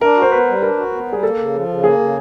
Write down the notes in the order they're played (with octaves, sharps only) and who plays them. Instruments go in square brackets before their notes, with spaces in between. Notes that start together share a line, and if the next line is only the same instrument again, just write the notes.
[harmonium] D4 [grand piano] A#4
[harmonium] F#4
[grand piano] C5
[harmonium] B3 [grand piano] B4
[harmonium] G3
[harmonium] D4 [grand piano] A#4
[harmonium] F#4
B3
[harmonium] G3 [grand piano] G#4
[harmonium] A#3 [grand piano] A4
[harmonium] C#3
F3
C#3
[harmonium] A#3 [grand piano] G#4
[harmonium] C#3